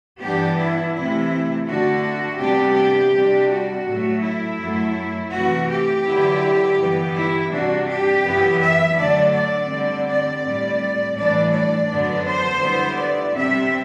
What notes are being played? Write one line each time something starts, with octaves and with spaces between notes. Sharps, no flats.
G2 E3 B3 D4 G4
E4
C3 E3 A3 C4 E4
D3 A3 D4 F#4
C3 G3 B3 D4 G4
G4
C3 G3 D4
F#4
A2 F#3 A3
E4
F#2 F#3 A3
C3 E3 A3 F#4
G4
D3 F#3 B3 E4
G2 E3 B3
E4
C3 G3 D4 F#4
G4
F#2 E3 B3 E4
E5
D3 F#3 A3 D4 D5
D5
D3 G3 C4
D5
A2 G3 C4
A2 E3 G3 D4 D5
D5
F#2 D3 F#3 B3 D4
C5
D3 G3 B3 E4
D5
C3 G3 C4 E5